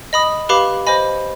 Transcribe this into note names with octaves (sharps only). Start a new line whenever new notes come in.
D#5 B5 D#6
G4 B4 F5 B5 D6
C5 D#5 G#5 B5